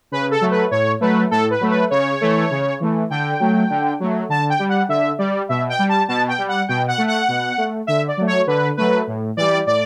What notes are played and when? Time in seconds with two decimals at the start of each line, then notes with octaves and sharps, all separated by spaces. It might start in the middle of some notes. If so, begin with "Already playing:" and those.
0.11 C#3 B4
0.31 A4
0.41 F#3 A3
0.51 B4
0.71 A2 C#5
1.01 F#3 A3 B4
1.31 A2 A4
1.50 B4
1.60 F#3 A3
1.71 B4
1.90 C#3 C#5
2.21 E3 A3
2.51 C#3
2.80 E3 A3
3.10 D3 G5
3.40 F#3 A3
3.70 D3
4.00 F#3 A3
4.29 D3 A5
4.50 G5
4.59 G3
4.69 F#5
4.89 D3 E5
5.19 G3 D5
5.49 B2 E5
5.69 G5
5.79 G3
5.89 A5
6.08 B2 A5
6.28 G5
6.38 G3
6.48 F#5
6.68 B2 G5
6.88 F#5
6.98 A3
7.08 F#5
7.28 B2
7.58 A3
7.87 D3 E5
8.08 D5
8.17 F#3 A3
8.27 C#5
8.47 D3 B4
8.77 F#3 A3 B4
9.07 A2
9.37 E3 G3 D5
9.66 A2 D5